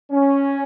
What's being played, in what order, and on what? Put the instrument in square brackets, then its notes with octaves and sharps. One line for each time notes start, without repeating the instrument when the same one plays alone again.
[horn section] C#4